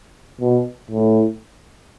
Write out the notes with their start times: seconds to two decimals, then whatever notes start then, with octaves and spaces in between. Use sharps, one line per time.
0.41 B2
0.91 A2